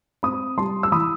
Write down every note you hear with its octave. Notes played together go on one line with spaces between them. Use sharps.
C4 B5 D#6
G3 A5 C6
E6
E3 B5 D#6